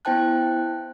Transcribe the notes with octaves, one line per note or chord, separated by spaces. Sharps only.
B3 E4 C5 G5 A5 F#6